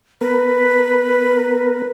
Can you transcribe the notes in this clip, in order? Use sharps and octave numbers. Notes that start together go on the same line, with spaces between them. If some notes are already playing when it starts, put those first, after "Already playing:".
B3 A#4 B4